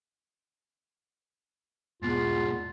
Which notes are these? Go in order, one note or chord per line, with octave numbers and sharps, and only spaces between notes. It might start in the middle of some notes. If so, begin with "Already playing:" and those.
E2 G#2 B2 F4